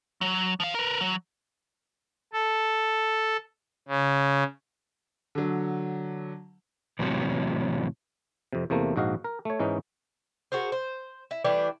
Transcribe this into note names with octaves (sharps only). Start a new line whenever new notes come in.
F#3
F3 F5
A#4 B4
F#3
A4
C#3
D3 F#3
E2 A2 C3 F#3
F2 C3
E2 C3 A3 A#3
A#1 G#2 F#4 D#5 F5
A#4
A3 C#5
G#2 E3 C#4 D#4
F#4 G#4 A#4 C5
C5
E4
E3 G3 A3 D4